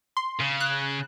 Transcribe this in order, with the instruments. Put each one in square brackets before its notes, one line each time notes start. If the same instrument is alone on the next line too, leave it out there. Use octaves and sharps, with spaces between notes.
[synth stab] C6
[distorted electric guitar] C#3
[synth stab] F#6